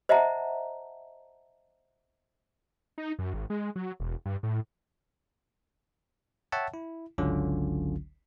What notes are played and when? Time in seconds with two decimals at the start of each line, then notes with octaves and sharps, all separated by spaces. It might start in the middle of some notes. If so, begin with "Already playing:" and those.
0.09 C5 D#5 E5 F#5 A5 A#5
2.98 D#4
3.19 F#2
3.34 G#1
3.50 G#3
3.76 F#3
4.00 E1
4.26 G2
4.43 A2
6.52 C#5 E5 F#5 G5 A5
6.74 E4
7.18 G1 C#2 D3 F#3 C#4 F4